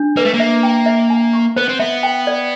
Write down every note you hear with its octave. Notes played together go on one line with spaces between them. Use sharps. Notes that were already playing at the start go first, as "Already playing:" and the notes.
Already playing: D4
A#3 B4
A3
A#3
E5
G5
E5
G#5
C#6
B3 C5
C4
B3 E5
G5
D5